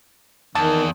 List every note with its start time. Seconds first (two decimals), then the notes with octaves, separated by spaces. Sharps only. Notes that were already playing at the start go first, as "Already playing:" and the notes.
0.55 E2 D#3 A5